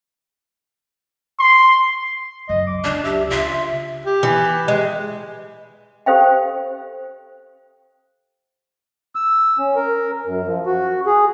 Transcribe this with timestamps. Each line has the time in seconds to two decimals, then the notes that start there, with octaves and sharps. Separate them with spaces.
1.40 C6
2.49 C#2 F#2 D#5
2.67 D6
2.84 C#2 D4 D5
3.05 G4 E5
3.30 C#3 F4 E5
4.06 G4
4.23 E3
4.68 G#3
6.06 G4 A4 C5 F5 G5
9.15 E6
9.58 C#4
9.76 A#4
10.26 F#2
10.47 F3
10.66 F#4
11.06 G#4